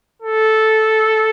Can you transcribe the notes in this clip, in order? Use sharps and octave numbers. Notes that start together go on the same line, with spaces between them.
A4